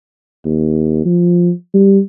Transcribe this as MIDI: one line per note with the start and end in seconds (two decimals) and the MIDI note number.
0.45 1.03 39
1.06 1.51 53
1.74 2.00 55